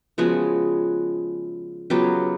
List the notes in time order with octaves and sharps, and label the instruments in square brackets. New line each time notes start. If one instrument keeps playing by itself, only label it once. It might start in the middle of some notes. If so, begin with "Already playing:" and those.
[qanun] C#3 F3 G#3 B3 F#4 G#4
C#3 F#3 B3 F4 G4